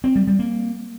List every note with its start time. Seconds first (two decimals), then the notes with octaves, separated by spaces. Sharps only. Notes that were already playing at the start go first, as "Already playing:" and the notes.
0.04 C4
0.16 G3
0.27 G3
0.39 A#3